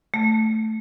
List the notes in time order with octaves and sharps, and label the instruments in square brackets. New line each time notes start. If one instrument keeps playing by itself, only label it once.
[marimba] A3